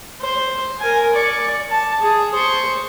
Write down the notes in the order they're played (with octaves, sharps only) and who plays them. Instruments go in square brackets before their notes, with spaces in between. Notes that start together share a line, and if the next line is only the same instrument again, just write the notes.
[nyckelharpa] C5
A#4 G#5
D5 C#6
A5
G#4
C5 C#6